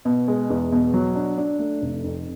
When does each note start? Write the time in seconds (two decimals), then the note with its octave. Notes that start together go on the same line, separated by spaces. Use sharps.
0.05 B2
0.28 G#3
0.50 E2
0.72 B2
0.94 F#3
1.16 D4
1.38 D4
1.59 A3
1.82 F1
2.04 F2